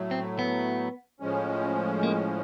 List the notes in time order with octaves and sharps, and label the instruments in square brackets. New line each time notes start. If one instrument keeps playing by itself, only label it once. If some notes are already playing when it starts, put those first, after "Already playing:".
Already playing: [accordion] A2 F#3 A3
[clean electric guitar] C4
B3
[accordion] A2 F3 G#3 C#4
[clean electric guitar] A#3